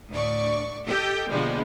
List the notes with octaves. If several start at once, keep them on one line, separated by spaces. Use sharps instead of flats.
D2 A2 D5 C#6
G4 A4 D#5 G5
B2 D3 F3 G3 G#3 A#3